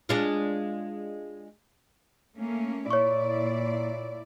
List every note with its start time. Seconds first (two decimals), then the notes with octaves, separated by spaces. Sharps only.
0.09 G#3 D4 F4
2.37 A3 A#3 C#4
2.90 A#2 E4 C#5 D5 C#6